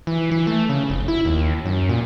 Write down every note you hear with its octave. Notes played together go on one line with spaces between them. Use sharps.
E3
E3
A3
C#3
F1
E4
D#2
F#2
A#2